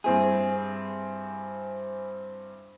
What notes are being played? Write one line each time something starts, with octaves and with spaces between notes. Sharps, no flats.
G2 C4 E4 G#4